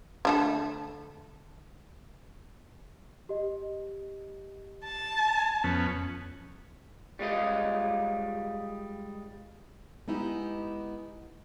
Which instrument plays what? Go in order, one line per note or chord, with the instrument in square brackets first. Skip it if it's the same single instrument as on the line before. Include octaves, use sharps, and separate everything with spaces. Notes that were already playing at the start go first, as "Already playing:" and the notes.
[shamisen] D3 A3 A4
[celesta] G4 D#5
[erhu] A5
[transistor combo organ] F2 B3 C#4
[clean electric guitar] G3 G#3 F4 D#5
[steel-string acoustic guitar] G#3 B3 D#4 E4 G4